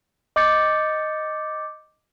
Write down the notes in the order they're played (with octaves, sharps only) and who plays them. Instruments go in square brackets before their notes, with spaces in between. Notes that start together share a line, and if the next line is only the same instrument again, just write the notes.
[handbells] D#5 D6 G6 A6 C#7